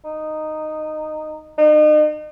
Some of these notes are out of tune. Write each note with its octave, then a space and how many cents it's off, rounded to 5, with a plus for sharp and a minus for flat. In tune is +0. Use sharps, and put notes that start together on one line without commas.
D#4 -10
D#4 -40